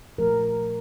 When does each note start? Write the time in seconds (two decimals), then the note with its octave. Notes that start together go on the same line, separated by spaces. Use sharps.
0.18 A#2 F3 A3 A#4